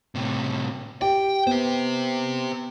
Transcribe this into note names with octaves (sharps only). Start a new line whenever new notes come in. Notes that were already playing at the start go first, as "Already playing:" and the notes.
A2 C3
G4 G5
B3 G4 C5